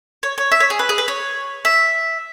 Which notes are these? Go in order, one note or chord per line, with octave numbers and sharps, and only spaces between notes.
C#5
C#5
E5
C#5
G#4
B4
G#4
B4
C#5
E5